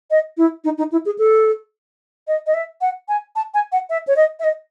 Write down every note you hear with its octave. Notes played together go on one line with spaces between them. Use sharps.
D#5
E4
D#4
D#4
E4
G#4
A4
D#5
D#5
E5
F#5
G#5
A5
G#5
F#5
E5
C#5
D#5
E5
D#5